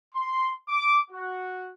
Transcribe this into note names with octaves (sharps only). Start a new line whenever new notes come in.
C6
D6
F#4